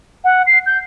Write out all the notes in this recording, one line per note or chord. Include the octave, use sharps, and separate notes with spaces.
F#5
C7
G6